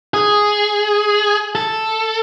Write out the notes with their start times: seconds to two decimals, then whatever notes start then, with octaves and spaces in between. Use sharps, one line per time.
0.14 G#4
1.55 A4